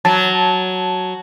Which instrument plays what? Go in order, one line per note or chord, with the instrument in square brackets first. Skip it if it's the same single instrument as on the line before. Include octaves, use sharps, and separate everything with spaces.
[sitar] F#3 [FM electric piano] A5